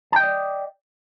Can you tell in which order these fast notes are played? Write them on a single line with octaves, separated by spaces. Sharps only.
A5 G5 D#5 D5